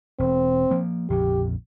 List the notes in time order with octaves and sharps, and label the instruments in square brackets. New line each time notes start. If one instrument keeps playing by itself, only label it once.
[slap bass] E1 [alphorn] C4
[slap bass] F3 A#3
[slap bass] A#1 F2 C#3 [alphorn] G4